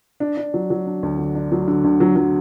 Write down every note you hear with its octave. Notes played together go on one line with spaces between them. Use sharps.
D4
D4
F#3
F#3
D4
D2
D3
D4
F#3
D3
D2
F#3
F#3